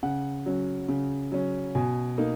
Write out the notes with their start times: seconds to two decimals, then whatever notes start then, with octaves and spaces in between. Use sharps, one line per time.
0.03 C#3 F#5
0.46 F#3 C#4
0.89 C#3
1.32 F#3 C#4
1.75 B2 G#5
2.18 A#3 D#4